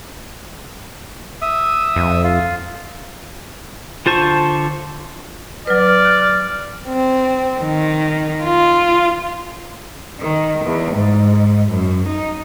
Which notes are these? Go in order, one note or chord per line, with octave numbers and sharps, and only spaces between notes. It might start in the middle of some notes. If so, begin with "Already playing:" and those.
E5 D#6
F2
F4
D3 F4 C5 A5 C#6
F#3 B4 D5 F6
F#6
C4
D#3
F4
D#3
E2
G#2
F#2
D#4